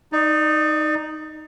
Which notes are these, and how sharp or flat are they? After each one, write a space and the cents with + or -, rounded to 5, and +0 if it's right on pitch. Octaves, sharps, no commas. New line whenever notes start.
D#4 +0 D5 +25